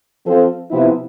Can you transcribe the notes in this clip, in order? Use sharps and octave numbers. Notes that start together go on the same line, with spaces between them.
F3 C4 F4 A4 C5
C3 F3 B3 E4